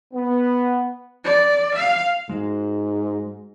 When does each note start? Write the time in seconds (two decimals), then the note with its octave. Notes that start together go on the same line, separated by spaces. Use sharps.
0.13 B3
1.24 D5
1.75 F5
2.29 G#2 G#3 F#4